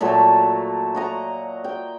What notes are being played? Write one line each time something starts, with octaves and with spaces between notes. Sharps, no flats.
A#2 F#3 A3 A4
F#4 D#5 A#5
G5